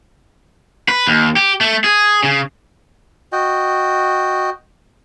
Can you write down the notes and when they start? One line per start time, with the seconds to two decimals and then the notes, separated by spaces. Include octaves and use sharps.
0.88 B4
1.07 D#2
1.36 G4
1.61 A3
1.84 G#4
2.23 C#3
3.32 F#4 D#5 G5